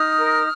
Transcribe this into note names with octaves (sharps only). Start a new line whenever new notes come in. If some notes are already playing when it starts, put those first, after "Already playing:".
Already playing: D#4 D#6 F6
A#4